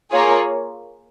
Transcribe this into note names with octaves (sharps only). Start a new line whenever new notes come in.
A#3 F4 G#4 C#5